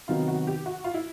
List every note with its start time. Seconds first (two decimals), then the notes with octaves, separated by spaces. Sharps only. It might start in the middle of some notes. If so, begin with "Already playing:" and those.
0.08 C3 D#3 F#3 B3 D#4 F4
0.28 F#4
0.47 G4
0.66 F#4
0.84 F4
0.94 E4